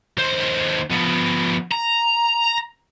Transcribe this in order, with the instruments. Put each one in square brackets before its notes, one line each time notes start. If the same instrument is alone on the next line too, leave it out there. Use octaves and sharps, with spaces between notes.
[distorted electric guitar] D#2 C5
F3 B3
A#5